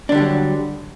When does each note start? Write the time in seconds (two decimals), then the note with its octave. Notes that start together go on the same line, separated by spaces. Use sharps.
0.09 D4
0.12 D3
0.15 G3
0.17 F#3